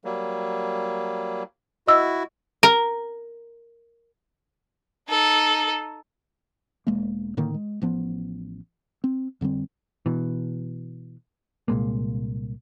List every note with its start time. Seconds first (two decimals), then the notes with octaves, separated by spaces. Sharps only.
0.05 F#3 G3 A#3
1.87 E4 F#4 D#5 E6
2.63 A#4
5.08 D#4 A4
6.87 E1 G#3 A#3
7.37 A2 D3 D#3 A#3
7.54 G#3
7.82 A1 F3 B3
9.04 C4
9.41 F2 D3 G3 C4
10.06 B2 E3
11.68 C2 A#2 G#3 A#3